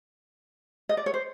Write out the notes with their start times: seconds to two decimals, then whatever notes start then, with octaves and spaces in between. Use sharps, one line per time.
0.89 D#5
0.97 D5
1.06 C#5
1.14 C5